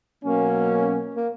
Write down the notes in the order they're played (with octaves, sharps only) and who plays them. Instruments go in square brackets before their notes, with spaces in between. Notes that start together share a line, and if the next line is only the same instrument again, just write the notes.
[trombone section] B2 F#3 C#4 [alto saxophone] A#3
[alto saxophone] A#3